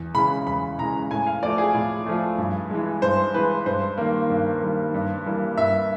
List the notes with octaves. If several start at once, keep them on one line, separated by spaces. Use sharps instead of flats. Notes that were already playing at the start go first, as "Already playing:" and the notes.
Already playing: E2
C#3 E3 G#3 B5
E2 B5
C#3 E3 G#3 A#5
A2 G#5
F5
F3 A3 D5
G#4
A2
F3 A3
G2
E3 G#3
G2 C5
E3 G#3 B4
G2 C5
D#3 G3 A#3
G2
D#3 G3 A#3
G2
E3 G3 A#3
G2 E5